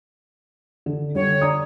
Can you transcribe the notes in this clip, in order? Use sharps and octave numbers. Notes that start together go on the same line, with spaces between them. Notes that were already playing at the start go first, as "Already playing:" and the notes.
D3
D3 G3 C#5
D5 A#5 D#6